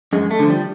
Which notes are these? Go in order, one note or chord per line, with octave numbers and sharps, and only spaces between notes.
F#2 G#3
A3
D3 F3
G3